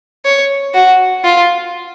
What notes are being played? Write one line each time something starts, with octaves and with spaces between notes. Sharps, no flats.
C#5
F#4
F4